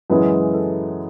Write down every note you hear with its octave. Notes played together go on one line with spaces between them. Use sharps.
F#2 C#3 E3 G#3 B4
A4